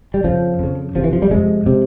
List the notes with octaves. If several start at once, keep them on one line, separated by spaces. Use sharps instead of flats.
G3
F2 C#3 F3
F2 C#3
F2 C3 F3
E3
F3
G3
F2 C3 G#3
C3